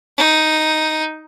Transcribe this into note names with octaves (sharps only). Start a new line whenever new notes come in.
D#4